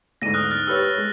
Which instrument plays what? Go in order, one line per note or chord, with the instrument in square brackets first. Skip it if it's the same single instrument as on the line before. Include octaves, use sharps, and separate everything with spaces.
[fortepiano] D2 G#2 [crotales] A#6 D#7
[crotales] D#6 F6 F#6
F6 F#6 A6
[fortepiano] G4 B4 C#5 [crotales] E6 A6
[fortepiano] G#3